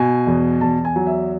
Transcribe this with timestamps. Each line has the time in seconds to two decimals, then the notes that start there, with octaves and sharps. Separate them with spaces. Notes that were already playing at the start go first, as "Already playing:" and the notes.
Already playing: B2 G#5
0.27 E2
0.61 E2 A5
0.85 G#5
0.96 F#3
1.07 E5